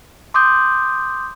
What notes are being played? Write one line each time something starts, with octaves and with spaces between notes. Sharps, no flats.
C6 D6 D#6 G6